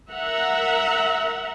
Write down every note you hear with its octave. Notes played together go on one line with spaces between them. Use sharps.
A#4 E5 F#5 A#5